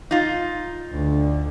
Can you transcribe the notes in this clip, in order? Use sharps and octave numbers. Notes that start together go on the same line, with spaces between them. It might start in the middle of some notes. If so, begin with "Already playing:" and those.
D#4 F4
D2 D3